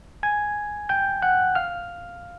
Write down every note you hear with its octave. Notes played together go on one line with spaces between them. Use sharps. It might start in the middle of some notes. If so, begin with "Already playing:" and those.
G#5 G#6
G5 G6
F#5 F#6
F5 F6